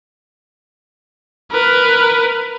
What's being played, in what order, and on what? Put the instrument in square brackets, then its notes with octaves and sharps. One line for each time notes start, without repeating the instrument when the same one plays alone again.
[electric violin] A#4 B4